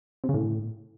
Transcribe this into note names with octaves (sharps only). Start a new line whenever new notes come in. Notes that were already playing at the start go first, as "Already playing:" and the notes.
C3
C#3
A2